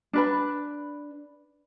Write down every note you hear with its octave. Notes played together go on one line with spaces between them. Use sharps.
D4 B4 B5